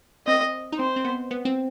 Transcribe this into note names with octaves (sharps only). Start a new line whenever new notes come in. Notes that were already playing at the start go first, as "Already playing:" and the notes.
C4 D#5
D#4
C4 C5
C4
B3
B3
C4